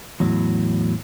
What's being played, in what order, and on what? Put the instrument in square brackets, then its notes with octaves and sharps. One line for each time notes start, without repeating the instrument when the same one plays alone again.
[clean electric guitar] E2 A2 F#3